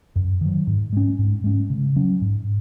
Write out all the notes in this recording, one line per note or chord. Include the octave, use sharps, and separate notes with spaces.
F#2
D#3 F#3
G#2
G#3 C#4
G#2
G#3 C#4
C#3
F#3 C#4
G#2